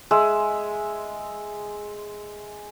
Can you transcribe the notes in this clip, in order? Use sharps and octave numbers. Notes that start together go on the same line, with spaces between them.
G#3 E5